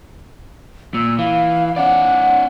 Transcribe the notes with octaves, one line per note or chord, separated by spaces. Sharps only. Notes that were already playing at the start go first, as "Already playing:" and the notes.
A#2 E6
E3 F5
C#4 D5 F#5